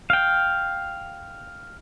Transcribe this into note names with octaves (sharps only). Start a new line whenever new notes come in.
F5 G5